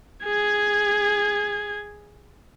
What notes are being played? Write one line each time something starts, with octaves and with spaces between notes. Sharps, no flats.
G#4 G#6